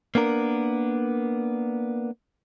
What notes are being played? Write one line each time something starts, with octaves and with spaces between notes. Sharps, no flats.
A#3 B3 D4 A#4